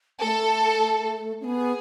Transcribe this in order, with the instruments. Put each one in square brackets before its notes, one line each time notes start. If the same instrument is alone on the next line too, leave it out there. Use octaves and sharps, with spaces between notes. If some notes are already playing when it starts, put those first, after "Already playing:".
[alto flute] A3 [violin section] A4
[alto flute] C#4
[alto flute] B3 [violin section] G#4